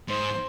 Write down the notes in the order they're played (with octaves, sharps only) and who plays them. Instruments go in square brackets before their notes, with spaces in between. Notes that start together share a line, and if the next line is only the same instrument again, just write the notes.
[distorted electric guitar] G#2 [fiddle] C5